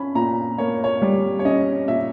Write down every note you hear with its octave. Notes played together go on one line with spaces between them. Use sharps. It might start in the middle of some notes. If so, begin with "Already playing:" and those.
Already playing: C#4 B5
A#2 A#5
A#3 C#5
C#5
G3
C#5
C#4 D#5
A#2 E5